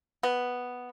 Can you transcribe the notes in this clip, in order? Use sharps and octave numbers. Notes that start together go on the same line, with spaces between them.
B3